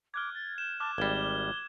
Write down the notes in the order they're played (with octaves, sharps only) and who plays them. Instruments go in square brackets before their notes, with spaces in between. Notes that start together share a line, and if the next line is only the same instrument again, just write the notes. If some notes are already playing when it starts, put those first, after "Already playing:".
[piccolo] D6 [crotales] F6 F#6 G#6
[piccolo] A6
[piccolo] G6 [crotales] E7
[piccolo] A5 [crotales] D6 F6 F#6
[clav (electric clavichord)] G#1 G3 [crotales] G#6 [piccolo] G7